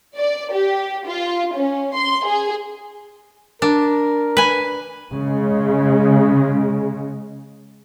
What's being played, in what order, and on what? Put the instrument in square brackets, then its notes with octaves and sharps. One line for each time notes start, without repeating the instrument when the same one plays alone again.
[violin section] D5
G4
F4
C#4
C6
G#4
[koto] D4 [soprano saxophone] A#4
[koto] B4 G#5
[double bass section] C#3 G#3